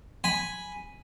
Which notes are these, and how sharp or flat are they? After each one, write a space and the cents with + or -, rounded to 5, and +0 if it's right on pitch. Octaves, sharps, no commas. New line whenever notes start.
G#5 +0 B5 +0